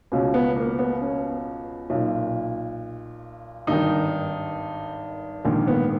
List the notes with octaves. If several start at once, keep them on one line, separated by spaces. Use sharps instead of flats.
C#2 B2 C#4
B3
A#3
B3
C#4
B1 A#2
G#1 G2 D#3 D#4
A#1 G#2 D#3 A#3
B3